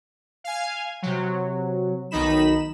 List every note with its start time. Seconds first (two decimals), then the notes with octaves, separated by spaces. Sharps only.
0.44 F5 G#5
1.02 C3 F#3
2.11 B1 D#3 D#4 B5 E7